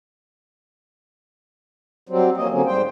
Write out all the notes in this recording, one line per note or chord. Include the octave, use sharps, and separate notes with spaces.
F#3 G3 C4
F3 A#3 C#4 D#5
D3 F#3 A#3 C4 C#4
G#2 G3 C5 G5